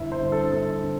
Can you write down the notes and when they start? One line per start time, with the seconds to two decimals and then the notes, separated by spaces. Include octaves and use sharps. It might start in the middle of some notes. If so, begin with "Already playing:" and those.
Already playing: G1 E4
0.12 C5
0.22 G2 D3
0.32 A4
0.52 G1 A4
0.83 D3